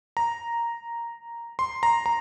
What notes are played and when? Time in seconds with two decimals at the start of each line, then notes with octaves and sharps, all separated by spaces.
0.17 A#5
1.59 C6
1.83 A#5
2.06 A#5